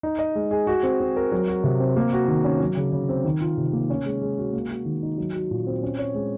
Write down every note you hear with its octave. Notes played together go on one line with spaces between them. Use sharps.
D#4
D#5
G#3
G#4
F#4
C4
C4
A#4
F#3
F#4
C3
C4
A#3
F#4
D#3
C#4
F#3
C#3
C#3
C4
D#3
F4
C3
A#3
C#4
G#3
G#3
F#4
A#3
F#4
D#3
D#4
F#3
F#4
A#2
C4
C#4
C#5
G#3